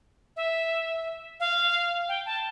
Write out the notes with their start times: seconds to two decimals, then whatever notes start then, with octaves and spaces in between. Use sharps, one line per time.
0.36 E5
1.40 F5
2.09 G5
2.26 A5